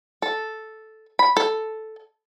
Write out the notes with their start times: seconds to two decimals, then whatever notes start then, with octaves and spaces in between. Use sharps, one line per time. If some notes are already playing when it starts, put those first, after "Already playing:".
0.22 A4
1.19 B5
1.37 A4